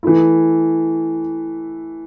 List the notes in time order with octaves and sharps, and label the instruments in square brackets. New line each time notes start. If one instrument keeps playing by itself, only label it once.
[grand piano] E3 A3 E4